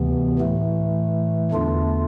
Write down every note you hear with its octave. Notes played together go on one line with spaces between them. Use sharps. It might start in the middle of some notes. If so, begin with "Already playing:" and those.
Already playing: D2 C3 E3 B3
A2 E3 A3
E2 D3 A3 D4 F4